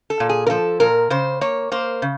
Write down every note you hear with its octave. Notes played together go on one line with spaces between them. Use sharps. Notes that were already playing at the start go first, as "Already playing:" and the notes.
A4
A#2
G#4
A#4
F3 A4
A#2 A#4
C#3 C5
A#3 C#5
A#3 C5
C#3